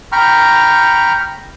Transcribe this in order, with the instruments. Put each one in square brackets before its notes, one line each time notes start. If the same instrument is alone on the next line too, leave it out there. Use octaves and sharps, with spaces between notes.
[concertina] G5 A#5 B5 C#6 F6